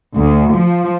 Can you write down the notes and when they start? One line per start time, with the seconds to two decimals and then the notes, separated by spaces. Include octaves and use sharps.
0.15 D2
0.54 F3